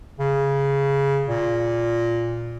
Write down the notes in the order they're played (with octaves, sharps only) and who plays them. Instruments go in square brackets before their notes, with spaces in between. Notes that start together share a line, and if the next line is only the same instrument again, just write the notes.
[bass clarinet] C#3
A#2